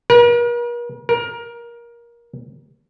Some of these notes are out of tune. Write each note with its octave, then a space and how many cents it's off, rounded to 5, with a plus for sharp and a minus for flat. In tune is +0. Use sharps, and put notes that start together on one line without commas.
A#4 +45
A#4 +20